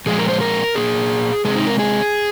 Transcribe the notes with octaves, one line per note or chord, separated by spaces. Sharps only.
A#2 F3 G#3 G#4
A#4
C5
A#4
A#2 A#3 G#4
C3 G#3 C4 G#4
D#4
A#4
G#4